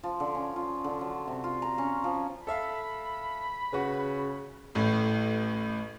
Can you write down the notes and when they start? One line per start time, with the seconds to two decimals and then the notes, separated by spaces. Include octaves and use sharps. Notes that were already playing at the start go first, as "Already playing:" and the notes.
0.03 F3
0.20 D3
0.35 C#4
0.56 F4
0.84 D3
1.01 F#3
1.27 C3
1.44 F4
1.62 A#5
1.78 C#4
2.04 F3
2.47 A4 E5 F5 B5
3.73 C#3 F#4 B4
4.75 A1 A2